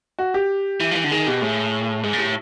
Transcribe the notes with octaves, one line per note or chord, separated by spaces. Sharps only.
F#4
G4
E3
F3
E3
D3
D#3 G#4
B2 G4
A2 G#4
G#2 G#4
A#2
A2 G4